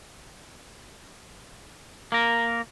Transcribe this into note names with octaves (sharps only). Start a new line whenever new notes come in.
A#3 A#4